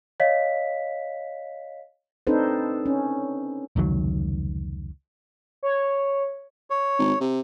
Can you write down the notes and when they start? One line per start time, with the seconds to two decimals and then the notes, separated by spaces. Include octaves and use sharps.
0.20 C#5 D#5 F5 B6
2.27 C4 D4 D#4 A4 B4 C5
2.86 C#4
3.76 F1 C#2 D#3 F#3
5.63 C#5
6.70 C#5
6.99 G#1
7.21 C3